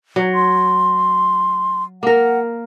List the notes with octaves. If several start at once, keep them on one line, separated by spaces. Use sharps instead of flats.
F#3
C6
A#3 A#4 F#5